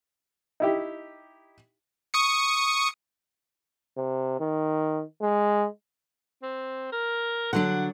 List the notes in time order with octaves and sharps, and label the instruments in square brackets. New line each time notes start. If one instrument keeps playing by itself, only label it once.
[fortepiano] D#4 E4 G4
[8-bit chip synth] C#6 D#6 C#7
[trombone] C3
D#3
G#3
[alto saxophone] C4
A#4
[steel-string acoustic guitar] D3 F#3 D4 [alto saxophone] F#5